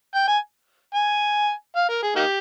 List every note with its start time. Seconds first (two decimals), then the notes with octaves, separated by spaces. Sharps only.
0.14 G5
0.28 G#5
0.95 G#5
1.76 F5
1.88 A#4
2.02 G#4
2.16 A#3 D#4 G4